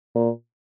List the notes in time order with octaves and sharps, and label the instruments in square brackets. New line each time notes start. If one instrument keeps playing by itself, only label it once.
[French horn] A#2